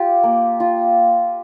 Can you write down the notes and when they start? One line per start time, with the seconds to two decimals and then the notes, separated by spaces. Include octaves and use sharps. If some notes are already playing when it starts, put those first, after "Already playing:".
Already playing: F4 G4
0.23 A#3
0.60 F4